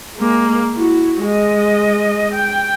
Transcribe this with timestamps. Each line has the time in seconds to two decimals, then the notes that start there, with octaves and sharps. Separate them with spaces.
0.16 G#3 A#3
0.75 E4 F#4
1.22 G#3 D#5
2.35 G5